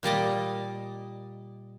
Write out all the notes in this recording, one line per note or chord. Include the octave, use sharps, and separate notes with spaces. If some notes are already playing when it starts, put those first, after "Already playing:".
A#2 G3 D5 D#5